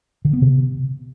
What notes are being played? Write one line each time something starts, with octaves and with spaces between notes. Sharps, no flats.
D3
B3
C3